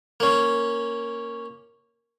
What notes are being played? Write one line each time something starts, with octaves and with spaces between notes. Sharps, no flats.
A#3 C#4